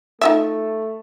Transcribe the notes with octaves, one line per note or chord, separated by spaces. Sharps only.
A3 D#4 F4 E5